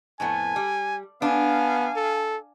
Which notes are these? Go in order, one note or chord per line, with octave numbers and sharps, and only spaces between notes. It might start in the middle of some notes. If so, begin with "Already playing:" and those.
F2 A2 B3 G#5
G3
B3 D4 F5 G#5
A4